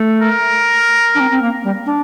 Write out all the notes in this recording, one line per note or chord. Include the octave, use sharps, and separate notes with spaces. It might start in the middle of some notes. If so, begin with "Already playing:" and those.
Already playing: A3
A#4
D4
C4
C4
A#3
G3
D4